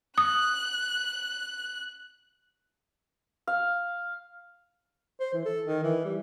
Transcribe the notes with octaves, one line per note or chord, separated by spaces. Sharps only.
D#6 F#6
F5
C5
E3
A4
D#3
E3
G3